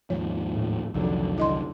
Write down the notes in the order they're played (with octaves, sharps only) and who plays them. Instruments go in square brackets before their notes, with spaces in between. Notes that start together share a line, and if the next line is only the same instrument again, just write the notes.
[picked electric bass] D#2 G#2 F3 [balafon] C#5
[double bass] A2
[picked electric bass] C2 D#3 F#3 [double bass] F2 D3 [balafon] F3
[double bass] D3 [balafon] E4 D#5 C6